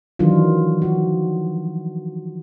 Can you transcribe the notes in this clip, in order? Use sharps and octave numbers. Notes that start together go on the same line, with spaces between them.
D#3 E3 F#3 D4 D#4 F4
F3 F#4